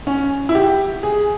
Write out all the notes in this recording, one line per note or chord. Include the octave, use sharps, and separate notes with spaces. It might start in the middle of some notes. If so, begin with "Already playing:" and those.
C#4
E4
G4
G#4